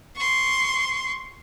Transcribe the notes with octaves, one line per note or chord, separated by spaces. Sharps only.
C6 C#6